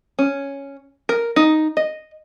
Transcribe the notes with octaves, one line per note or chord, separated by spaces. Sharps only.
C#4
A#4
D#4
D#5